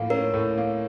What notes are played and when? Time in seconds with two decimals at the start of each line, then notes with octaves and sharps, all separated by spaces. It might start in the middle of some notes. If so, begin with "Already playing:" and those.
Already playing: A2 F3 A#3
0.10 C#4 A#4
0.33 A2
0.58 A#3